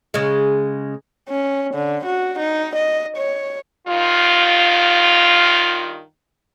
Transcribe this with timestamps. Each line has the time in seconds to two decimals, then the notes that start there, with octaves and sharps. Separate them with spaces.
0.14 C#3 G#3
1.29 C#4
1.74 D3
2.06 F#4
2.39 D#4
2.76 D#5
3.17 C#5
3.87 G2 D#3 F4